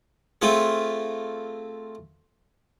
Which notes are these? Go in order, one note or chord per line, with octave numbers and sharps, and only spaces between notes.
A3 C4 F4 G#4